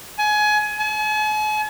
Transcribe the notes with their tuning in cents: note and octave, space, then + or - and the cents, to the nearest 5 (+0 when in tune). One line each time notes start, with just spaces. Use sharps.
G#5 +25
G#5 +45